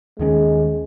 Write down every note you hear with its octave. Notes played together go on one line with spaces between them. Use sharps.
D#2 D#3 G#3 C#4